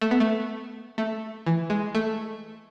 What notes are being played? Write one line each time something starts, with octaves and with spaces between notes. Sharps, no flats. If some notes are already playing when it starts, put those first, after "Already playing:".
A3
B3
A3
A3
E3
G#3
A3